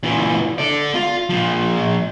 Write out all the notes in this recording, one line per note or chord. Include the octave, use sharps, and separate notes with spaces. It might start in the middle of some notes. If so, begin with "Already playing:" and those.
A#2 E3
A4 D5
F4
A#2 F3